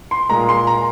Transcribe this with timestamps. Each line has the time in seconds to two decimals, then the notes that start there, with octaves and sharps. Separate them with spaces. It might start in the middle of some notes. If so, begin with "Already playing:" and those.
0.11 C6
0.29 A#2 G#3 A#5
0.49 C6
0.67 A#5